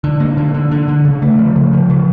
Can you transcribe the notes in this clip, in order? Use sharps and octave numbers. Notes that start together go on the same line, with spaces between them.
D3
A#3
D3
D3
D3
D3
C#3
A3
F3
C#3
F3
C#3